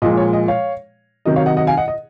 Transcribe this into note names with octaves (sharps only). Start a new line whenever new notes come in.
A#2 F3 G#3 D#5
C#5
D#5
C#5 F5
C3 D#3 F#3 D#5
C#5 F5
D#5 F#5
D#5 F#5
F5 G#5
D#5 F#5
D#5